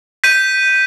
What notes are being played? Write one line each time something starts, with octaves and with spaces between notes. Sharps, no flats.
G6 B6 D#7